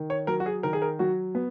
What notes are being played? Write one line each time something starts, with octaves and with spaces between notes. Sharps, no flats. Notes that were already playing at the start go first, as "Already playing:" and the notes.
Already playing: D#3
C#5
F#3 A#4
F#4
G#4
D#3 A#4
G#4
A#4
F#3 F#4
B3